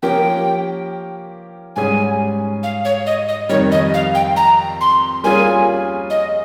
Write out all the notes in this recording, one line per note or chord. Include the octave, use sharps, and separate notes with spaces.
F3 A#3 C#4 G4 G5
G#2 G3 C#4 G#4 G#5
F5
C#5
D#5
D#5
F2 D#3 G3 C#5
D#5
F5
G5
A#5
C6
G3 A#3 C#4 F4 G#4 G#5
D#5